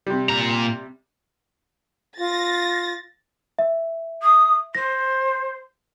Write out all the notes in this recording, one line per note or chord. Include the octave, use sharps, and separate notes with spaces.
C3 G3
A#2 A#5
F4 A6 A#6
E5
D#6
C5 A#6